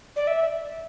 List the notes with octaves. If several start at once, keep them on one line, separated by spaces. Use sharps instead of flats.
D5
E5